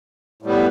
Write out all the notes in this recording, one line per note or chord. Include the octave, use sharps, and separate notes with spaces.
A2 G3 B3